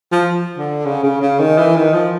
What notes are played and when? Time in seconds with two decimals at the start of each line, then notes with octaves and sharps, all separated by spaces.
0.12 F3
0.58 D3
0.85 C#3
1.03 C#3
1.21 C#3
1.39 D#3
1.58 E3
1.76 D#3
1.94 F3